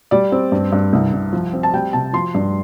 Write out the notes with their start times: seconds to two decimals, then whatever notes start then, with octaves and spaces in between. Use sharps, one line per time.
0.11 G3 D5
0.32 C4
0.52 G2
0.72 G2
0.93 C2
1.13 C2
1.33 F3
1.53 C4
1.63 A5
1.73 G3 G5
1.93 C3 A5
2.13 F3 C6
2.34 G2